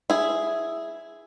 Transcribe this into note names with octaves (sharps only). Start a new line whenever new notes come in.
E4 G#4